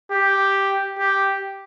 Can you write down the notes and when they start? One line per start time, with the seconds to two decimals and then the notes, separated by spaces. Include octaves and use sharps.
0.12 G4
0.99 G4